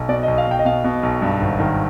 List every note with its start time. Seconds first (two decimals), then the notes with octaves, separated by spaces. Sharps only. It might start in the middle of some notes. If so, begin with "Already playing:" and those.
Already playing: B1
0.09 B2 D5
0.23 D#5
0.27 B1
0.38 F5
0.47 B1 G5
0.59 D#5
0.65 B2 F5
0.84 B2
1.03 B1
1.22 G2
1.41 G#1
1.59 D#3